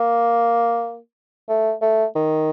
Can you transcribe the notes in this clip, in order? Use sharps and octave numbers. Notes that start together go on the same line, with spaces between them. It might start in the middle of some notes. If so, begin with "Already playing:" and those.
Already playing: A#3
A3
A3
D#3